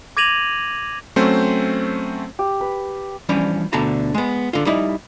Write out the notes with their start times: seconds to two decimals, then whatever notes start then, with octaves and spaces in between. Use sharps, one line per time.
0.17 D6 G#6 A#6 D#7 F7 F#7
1.16 F#3 A3 C4 C#4 C5
2.39 G4
2.61 B4
3.29 E3 F3 G3 C#4 D4
3.73 D2 B2 D3 A5 A#5
4.14 G#3 B3
4.53 D3 F4
4.66 G3 D#4 E4